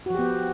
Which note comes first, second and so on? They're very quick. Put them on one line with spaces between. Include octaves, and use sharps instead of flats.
F#4 F3 G4 B3